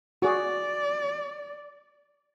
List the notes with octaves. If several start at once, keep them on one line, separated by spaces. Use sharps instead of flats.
F#4 G#4 D5